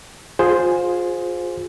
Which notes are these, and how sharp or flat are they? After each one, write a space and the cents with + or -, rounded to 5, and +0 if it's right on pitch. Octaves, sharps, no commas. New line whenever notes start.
F4 +30 G#4 +0 C5 +0